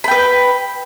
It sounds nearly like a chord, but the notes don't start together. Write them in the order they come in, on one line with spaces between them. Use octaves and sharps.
B5 G5 B4